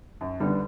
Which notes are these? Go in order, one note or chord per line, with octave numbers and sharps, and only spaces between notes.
F#2
D3 G3 B3 D4